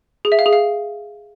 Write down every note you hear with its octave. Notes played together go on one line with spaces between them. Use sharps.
G#4
E5
F5
G#4
F5